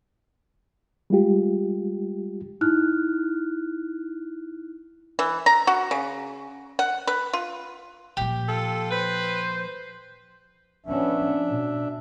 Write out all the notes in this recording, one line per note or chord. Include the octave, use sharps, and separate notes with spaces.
G3 G#3 F4 G4
D#4 E4 F6 F#6
E3
A#5
F#4
C#3
F#5
B4
F4
A#2 F3 G4
F4 A4
B4 C5
F3 B3 C#4 D4 E5
B2